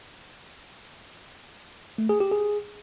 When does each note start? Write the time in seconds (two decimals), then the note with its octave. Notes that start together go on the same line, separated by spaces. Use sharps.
1.98 A3
2.09 G#4
2.20 G4
2.31 G#4